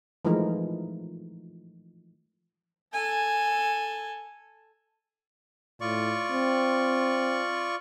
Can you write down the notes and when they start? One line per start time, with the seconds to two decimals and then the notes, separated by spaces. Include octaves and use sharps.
0.25 E3 F3 G#3 A3 D#4 A#4
2.94 A4 G#5
5.81 A2 F4 D5 C#6
6.31 C4